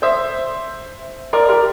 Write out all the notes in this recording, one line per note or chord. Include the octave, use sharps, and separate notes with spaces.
C5 E5
A#4 D5
G4 A#4